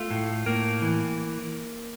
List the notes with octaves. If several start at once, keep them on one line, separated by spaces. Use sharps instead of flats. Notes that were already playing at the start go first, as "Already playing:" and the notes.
Already playing: A3 F4
A2
A2 A#3
E3